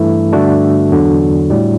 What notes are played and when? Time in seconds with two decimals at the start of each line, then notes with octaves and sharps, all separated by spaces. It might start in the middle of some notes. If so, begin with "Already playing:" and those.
Already playing: G2 E3 A3 E4
0.33 G2 D3 A3 D4 F#4
0.91 E2 D3 F#3
1.50 A2 G3